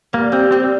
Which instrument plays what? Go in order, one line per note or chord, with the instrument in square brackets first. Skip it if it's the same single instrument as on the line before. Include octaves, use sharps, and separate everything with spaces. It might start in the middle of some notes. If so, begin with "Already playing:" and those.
[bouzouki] G3 [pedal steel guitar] A#3
[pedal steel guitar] C4 [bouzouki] G4
[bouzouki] G3 [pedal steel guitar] C4